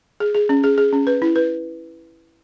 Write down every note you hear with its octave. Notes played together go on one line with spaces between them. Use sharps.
G#4
G#4
C#4
G#4
G#4
C#4
B4
E4
B4